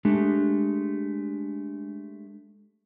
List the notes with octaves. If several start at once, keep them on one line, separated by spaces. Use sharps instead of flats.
G#3 A3 D4 G4